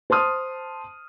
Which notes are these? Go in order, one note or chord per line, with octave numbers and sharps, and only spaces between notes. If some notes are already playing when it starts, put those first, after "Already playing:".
C5 A5 C6 D#6 F6